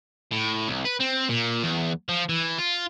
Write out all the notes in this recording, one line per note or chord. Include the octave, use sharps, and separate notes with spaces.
A2
C2
B4
C4
A#2
E2
F3
E3
F4